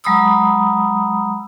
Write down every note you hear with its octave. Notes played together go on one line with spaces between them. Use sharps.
F#3 G#3 A#5 B5 D#6 E6